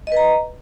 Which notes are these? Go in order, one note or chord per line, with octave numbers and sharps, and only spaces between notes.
B4 D#5 A#5